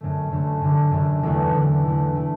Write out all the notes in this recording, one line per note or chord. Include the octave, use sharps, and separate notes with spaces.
F#2 D3 A3
F#2 D3 A3
F#2 D3 A3
F#2 D3 A3
E2 D3 A3 E4
E2 D3 A3 E4
E2 D3 A3 E4
D3 A3 E4